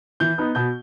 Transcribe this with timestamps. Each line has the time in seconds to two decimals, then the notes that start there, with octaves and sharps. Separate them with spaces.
0.20 E3 G6
0.38 B3 D#4
0.55 B2 G6